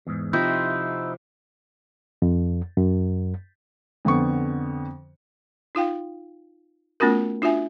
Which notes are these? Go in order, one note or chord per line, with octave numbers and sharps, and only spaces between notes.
E2 G#2
C3 F3 C4 D#4 E4
F2
F#2
F2 D3 B3 C#6
D#4 F4 F5 G5
A3 B3 C#4 F4 F#4 A#4
D4 F4 F#4 E5 G#5